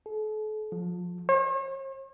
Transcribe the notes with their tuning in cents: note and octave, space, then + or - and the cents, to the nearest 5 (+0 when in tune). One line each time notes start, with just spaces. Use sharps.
A4 -40
F3 +25
C#5 -45